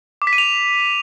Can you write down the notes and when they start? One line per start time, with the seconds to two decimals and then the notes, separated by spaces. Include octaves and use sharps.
0.22 D6
0.27 B6
0.33 D#7
0.38 F7